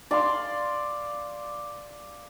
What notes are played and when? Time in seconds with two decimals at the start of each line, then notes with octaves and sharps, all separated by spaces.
0.11 D5 F5 C6